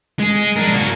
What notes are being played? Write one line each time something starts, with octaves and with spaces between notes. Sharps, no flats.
G#3 G#4
D4 A#4
A#3 F#4